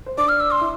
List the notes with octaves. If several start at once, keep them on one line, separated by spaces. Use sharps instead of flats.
C5
D4 D5 D6
F6
E6
C6
E4 E5